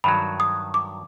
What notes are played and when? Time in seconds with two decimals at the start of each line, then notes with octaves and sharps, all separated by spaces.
0.04 G2 D#3 F#3 B5
0.40 D#6
0.74 D6